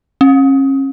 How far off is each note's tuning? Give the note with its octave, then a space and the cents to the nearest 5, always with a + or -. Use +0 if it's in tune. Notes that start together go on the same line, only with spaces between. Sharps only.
C#4 -35